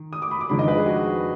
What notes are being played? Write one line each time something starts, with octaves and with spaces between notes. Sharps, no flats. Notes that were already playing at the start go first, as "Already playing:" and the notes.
Already playing: D#3
D#6
D6
B5
D6
F2 D#3 G#3 D4 B5
D#5
B4
G#4
F#4